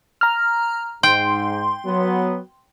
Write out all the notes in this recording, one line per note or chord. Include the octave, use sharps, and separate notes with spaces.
A#5 F6
G#2 G5 C6
F#3 B3